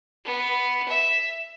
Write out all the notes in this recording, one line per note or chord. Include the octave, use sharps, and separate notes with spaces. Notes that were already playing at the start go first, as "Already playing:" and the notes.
B3
E5